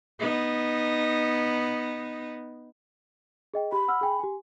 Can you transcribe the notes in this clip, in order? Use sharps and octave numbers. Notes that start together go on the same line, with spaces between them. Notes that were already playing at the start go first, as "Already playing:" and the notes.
B3 D#4
G#4 D#5 G5
G4 B5
F#5 E6 F6
G#4 G5 G#5
G4 G#5